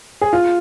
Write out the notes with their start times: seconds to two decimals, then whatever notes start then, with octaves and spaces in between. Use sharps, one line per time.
0.21 G#4
0.33 F4